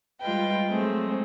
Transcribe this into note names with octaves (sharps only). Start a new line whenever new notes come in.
G3 G#3 F4 B4 D#5 G5
F#3 G#3 A3 C4 G#4